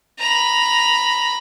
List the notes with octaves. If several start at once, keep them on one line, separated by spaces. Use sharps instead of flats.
A#5 B5